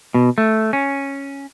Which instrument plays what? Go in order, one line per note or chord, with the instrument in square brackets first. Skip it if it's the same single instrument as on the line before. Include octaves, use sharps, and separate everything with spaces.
[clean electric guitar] B2
A3
C#4